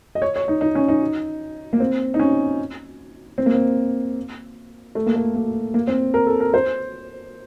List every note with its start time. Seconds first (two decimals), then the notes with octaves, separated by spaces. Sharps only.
0.15 D#5
0.22 C#5
0.36 C#5
0.48 D#4
0.61 D#4
0.75 C#4
0.88 D#4
1.73 A#3
1.80 C4
2.14 D#4
2.19 C#4
3.38 C4
3.46 A#3
3.55 C4
4.95 A3
5.06 A#3
5.16 A3
5.35 A#3
5.74 A#3
5.87 C4
6.14 A#4
6.27 A4
6.40 A#4
6.54 C5